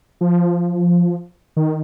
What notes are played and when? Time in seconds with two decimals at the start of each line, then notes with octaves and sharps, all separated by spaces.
0.21 F3
1.57 D#3